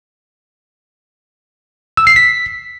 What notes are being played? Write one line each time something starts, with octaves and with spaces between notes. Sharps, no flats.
E6
C7
B6